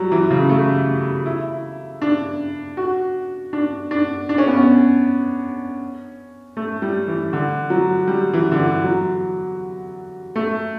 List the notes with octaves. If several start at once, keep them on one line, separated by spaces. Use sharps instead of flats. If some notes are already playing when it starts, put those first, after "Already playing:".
Already playing: F#3 G3
E3
C#3
A3
E4
D4
F#4
D4
D4
D4
C#4
B3
C#4
A3
G3
E3
D3
F#3
G3
E3
D3
E3
F#3
A3